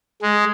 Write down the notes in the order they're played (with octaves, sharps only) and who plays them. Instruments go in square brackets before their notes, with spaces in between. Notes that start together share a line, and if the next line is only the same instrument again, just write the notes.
[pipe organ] G#3